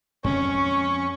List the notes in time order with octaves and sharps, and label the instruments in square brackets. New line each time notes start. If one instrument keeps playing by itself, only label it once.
[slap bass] F2 G#3 C4 [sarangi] C#4 [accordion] C#6